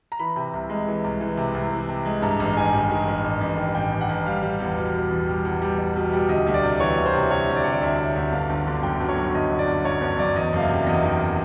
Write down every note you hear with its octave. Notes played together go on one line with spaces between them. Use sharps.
A#5
E3 B5
C3
C2
G#3
E3
C2
E3
C3
C2
E3
C3
G#3
G2 A#5
A1 A#5
D#3 G#5
A1
D#3
A1
A1
A1
D#3
A1 G5
A1
F#5
A1
G3 F5
G3
E2
B2
B2
E2
G3
E2
G3
G3
B2
G3
D2 D#5
D2
D5
C3
E3 C#5
D2
C5
C3
C3 C#5
D2
D5
C3 C#5
D5
D2 E5
C3
D2 E5
G1 F5
G1
D3
F#2 G5
G1
C#5
F#2
G1 D#5
G1
D5
G1
F#2 C#5
G1 C#5
F#2 D5
E2 D#5
F#1 F5
E5
C3
E2 D#5
D#3